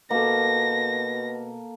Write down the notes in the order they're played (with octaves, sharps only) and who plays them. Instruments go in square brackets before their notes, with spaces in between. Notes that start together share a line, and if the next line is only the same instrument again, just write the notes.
[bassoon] B2 [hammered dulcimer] A#3 A4 [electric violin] A#6